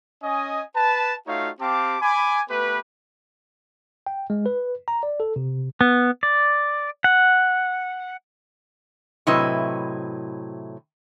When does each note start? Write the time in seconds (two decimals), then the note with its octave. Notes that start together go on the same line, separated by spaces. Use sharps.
0.23 C#4 D#5 G#5
0.75 B4 A5
1.27 A3 D#4 F4 F#4 C#5 F5
1.61 C4 G4 F5 A5 D6
2.02 G#5 B5 D6
2.50 A3 B3 G4 B4
4.06 G5
4.30 G#3
4.46 B4
4.88 A#5
5.03 D5
5.20 A4
5.36 C3
5.81 B3
6.23 D5
7.04 F#5
9.27 A2 C3 F#3 E4 B4 D#5